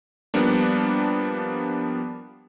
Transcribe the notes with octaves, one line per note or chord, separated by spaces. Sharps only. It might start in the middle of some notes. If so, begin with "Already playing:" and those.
F3 G3 A#3 B3 D4